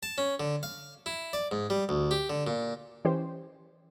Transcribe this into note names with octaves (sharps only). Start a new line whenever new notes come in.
A5
C#4
D3
F5
E4
D5
G#2
G3
D2
G4
D3
A#2
E3 C#4 G4 C5